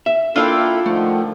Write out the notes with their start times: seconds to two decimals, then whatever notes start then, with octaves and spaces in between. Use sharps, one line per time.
0.06 E5
0.36 A#3 D4 E4 F4 A4 F5 G5
0.86 D3 D#3 F3 A3